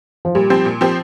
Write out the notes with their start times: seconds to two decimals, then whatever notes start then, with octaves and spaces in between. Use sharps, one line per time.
0.25 F3
0.35 A#2 G3
0.50 F3 C4 G4 C5
0.65 A#2
0.81 F3 C4 G4 C5